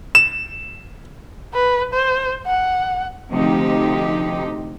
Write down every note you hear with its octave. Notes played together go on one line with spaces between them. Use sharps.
E7
B4
C5
F#5
D2 C3 F3 D#4 G4